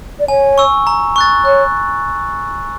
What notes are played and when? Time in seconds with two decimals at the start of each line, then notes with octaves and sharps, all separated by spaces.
0.20 D5
0.28 C#5 G#5
0.58 C#6 E6
0.87 A#5
1.16 C#6 F#6 A6
1.45 C#5 F#6